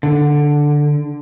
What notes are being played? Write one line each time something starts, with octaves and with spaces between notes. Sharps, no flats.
D3